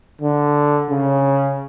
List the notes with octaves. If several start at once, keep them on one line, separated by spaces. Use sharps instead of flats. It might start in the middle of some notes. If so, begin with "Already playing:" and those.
D3
C#3